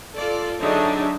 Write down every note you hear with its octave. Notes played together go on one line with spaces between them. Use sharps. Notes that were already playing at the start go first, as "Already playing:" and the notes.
F4 A4 D5
D3 F#3 D4 D#4 G#4 E5